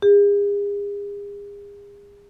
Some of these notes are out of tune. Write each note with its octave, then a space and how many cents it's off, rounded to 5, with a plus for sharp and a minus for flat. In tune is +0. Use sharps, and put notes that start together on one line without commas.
G#4 -40